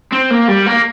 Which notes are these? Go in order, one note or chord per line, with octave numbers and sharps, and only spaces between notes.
C4
A#3
G3
A#3